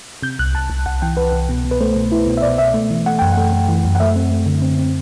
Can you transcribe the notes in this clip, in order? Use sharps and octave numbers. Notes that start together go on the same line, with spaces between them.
C3 G6
C2 F#6
C2 A5
C2
C2 F#5
E3 G5
C2 B4
C2
B2
B2
B4
A3 C5
B2
E4
B2
E5
B2 D5
B2 E5
A3
E3
A3 F#5
F#2 G5
A3 F#5
A3
E3
F#2
F#5
A3 E5
C4
A3
D3
C4
C4